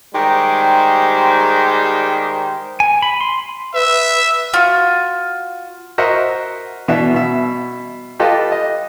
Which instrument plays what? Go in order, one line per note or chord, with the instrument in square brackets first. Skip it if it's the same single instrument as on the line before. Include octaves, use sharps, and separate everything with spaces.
[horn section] D#3 G3 G#3 G4 C5
[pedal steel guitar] G#5
B5
C6
[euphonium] B4 [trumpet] E5
[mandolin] F4 F#4
[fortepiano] F#4 A#4 C5 D#5 E5 F#5
B2 E3 B3 D4 E5
B2 E5
F4 G4 A4 B4 D#5 F5
D#5